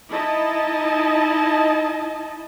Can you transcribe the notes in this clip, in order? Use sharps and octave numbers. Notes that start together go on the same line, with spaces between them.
D#4 E4 D#5 A5